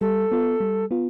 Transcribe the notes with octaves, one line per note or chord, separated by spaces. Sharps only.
G3 A4
B3 F4
G3
B3 F4